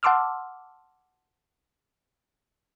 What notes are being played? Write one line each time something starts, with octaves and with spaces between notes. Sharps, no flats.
F#5 A5 C6 D6 E6 F6